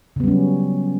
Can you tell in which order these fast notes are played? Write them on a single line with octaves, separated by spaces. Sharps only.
C#3 B3 G3 C#4 F#3